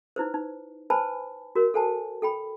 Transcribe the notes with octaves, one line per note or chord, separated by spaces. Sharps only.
D#4 E4 B4 C5
D#4
B4 C5 G#5 A5 B5
F#4 A#4 C#5
A4 C5 F#5 G#5 A5
A4 G5 B5